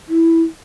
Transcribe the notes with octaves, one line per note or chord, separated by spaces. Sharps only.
E4